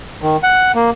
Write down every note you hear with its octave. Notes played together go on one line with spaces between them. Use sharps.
D#3
F#5
A#3